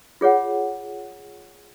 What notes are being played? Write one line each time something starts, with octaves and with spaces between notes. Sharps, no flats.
F4 G#4 C#5 F#5